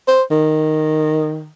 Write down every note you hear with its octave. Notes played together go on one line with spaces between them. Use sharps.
C5
D#3